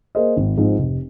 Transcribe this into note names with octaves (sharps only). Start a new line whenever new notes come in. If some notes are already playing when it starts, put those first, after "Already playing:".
A#3 G#4 C5 D#5
G#1
G#2 F3 C4 D#4
F1